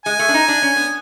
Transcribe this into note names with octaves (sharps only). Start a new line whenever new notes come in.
G#3 G#5
A3
D4
D#4
D4
C#4
B3